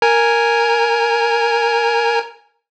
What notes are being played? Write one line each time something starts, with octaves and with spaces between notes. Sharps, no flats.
A#4 G#5